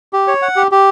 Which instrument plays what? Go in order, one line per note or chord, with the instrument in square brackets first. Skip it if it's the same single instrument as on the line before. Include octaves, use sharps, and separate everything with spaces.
[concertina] G4
C#5
F#5
G4
G4